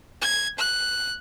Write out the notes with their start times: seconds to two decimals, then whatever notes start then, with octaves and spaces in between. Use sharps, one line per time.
0.21 G#6
0.59 F#6